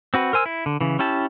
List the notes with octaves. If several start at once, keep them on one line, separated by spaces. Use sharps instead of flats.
C4 F#4 B4
A#4 C5 G#5 E6
E4
D3
C#3 E3
C#4 E4 G4 A5